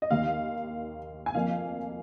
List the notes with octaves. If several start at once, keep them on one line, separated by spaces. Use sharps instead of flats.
D#5
D#2 D#3 A#3 F5
G#5
F2 F3 A#3 F5